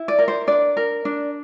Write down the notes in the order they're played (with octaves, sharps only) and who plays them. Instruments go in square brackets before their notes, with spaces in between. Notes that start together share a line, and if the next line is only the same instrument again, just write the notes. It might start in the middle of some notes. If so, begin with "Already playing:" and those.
Already playing: [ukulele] E4
D5
A#4
C5
D4 D5
A#4
D4